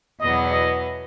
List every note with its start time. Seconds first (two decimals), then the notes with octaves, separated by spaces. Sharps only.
0.20 E2 B2 F#3 B3 E4 D#5
0.51 D#5